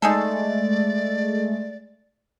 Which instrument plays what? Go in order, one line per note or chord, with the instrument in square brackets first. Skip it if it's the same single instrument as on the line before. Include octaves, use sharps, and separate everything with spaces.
[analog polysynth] G#3 A3 [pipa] D#4 G#4 A4 [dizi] D5